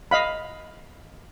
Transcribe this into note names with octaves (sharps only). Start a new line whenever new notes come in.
D#5 F5 B5